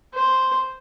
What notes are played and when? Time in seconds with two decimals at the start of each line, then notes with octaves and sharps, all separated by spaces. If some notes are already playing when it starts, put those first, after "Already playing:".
0.14 C5